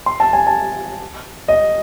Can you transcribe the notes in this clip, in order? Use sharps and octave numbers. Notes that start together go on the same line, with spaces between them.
C6
A5
G#5
A5
D#5